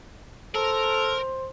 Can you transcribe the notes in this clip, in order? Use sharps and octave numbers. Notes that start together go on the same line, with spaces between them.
A4 A#4 C5